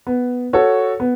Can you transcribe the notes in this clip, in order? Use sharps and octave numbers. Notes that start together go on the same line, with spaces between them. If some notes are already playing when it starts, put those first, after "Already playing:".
B3
F#4 A4 C#5
B3